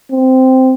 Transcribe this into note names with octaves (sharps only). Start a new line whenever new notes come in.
C4